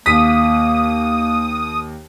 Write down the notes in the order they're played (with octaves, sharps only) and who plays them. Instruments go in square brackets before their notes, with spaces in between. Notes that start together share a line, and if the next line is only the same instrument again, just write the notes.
[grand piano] D#2 B6 [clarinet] A#3 [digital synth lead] D#6